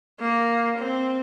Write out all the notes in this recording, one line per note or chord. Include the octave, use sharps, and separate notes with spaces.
A#3
C4